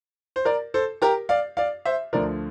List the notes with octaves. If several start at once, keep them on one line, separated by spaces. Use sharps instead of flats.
C5
A#4 D5
A4 C5
G4 A#4
D5 F5
D5 F5
C5 E5
D2 D3 F3 A#4 D5